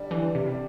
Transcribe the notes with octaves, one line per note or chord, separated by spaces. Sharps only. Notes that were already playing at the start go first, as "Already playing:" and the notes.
Already playing: D3 G3 D4
D3 E3
C3
G3 D4